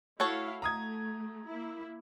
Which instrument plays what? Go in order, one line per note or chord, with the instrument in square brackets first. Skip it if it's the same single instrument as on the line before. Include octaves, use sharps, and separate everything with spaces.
[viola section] A3 E4 F5 [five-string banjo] F#4 A4 C#5
[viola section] A3 [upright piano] A#5 D#6 G#6
[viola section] A#3 E4